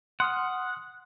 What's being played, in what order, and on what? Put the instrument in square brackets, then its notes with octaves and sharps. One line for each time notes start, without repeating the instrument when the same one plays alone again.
[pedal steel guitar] F#5 [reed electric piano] C6 D#6 F6